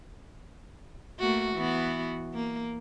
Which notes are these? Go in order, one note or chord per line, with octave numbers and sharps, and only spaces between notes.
A3 A#3 F#4
E3 B3 F#4
A#3